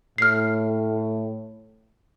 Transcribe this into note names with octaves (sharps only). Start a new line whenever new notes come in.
A2 F6 C7